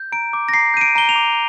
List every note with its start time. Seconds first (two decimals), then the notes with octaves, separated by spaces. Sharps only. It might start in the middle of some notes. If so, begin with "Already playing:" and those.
Already playing: G6
0.12 A#5 D7
0.33 D6
0.49 A#6
0.53 A#5 C7
0.74 G6 D#7
0.81 D7
0.96 A#5 G7
1.09 F7
1.16 D6